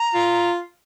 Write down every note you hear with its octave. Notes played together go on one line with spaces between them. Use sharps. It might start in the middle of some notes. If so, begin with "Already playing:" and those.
Already playing: A#5
F4